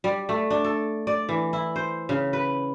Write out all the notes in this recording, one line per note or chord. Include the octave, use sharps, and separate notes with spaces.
G3
A3
D4
A4
D5
E3
E4
C5
C#3
B4